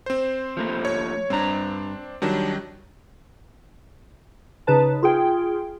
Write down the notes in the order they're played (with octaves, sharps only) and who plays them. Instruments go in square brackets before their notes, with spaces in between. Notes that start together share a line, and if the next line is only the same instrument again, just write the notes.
[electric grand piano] C4 C5
[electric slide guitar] F3 A3 A#3
[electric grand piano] C#5
[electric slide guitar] G2 A#5 [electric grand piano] C4 D4
[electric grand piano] D#3 F#3 G3 [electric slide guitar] D4
[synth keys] C#3 D#4 B4 A5
F4 G#4 G5